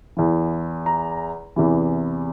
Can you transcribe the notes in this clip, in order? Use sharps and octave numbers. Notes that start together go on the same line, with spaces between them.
E2 E3
A#5
E2 C3 E3